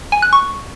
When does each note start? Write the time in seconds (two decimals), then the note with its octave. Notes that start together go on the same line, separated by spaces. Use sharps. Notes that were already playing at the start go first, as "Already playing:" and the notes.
0.12 G#5
0.22 F#6
0.33 C#6